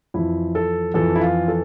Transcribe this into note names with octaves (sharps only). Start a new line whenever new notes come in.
F2 E3 E4
A4
F2 E3 A4
E4
F4
A4